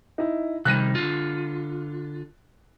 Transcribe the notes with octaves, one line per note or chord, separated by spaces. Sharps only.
D#4 E4
C3 D#3 G3 F#6 A#6 D#7
D3 F4